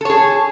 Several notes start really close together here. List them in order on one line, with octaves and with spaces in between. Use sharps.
A4 C#5 G#4